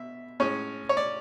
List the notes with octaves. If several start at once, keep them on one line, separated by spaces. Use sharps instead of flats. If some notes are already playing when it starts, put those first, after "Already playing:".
Already playing: B2 E5
A2 G#3 C#4 C#5
C#5
D5